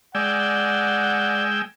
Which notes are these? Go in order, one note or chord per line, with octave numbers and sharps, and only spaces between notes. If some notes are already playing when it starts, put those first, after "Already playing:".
G#3 D5 F#5 G5 E6